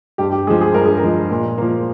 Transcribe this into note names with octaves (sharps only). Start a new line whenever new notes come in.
G2 G4
G4
F3 G#3 G#4
G#4
G2 A#4
G#4
A#4
F3 G#3
A#2
F3 A#3